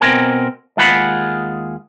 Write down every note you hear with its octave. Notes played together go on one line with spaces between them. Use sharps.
B2 G#3 C4 A#4 G#5
D#2 G#3 F4 G#4 F#5 B5